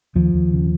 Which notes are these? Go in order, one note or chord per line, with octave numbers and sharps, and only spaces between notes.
D#2 F3
D#2
C#3